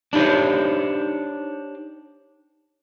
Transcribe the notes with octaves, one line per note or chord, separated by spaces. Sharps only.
D4 D#4 G4 C5 C#5